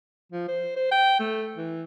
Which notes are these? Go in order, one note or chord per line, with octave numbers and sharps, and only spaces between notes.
F3
C5
C5
G5
A3
E3